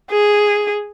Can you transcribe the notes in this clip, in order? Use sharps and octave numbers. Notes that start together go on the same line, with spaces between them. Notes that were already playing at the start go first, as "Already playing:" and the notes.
G#4